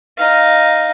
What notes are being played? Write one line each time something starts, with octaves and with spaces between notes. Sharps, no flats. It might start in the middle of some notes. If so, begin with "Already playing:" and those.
D#4 F5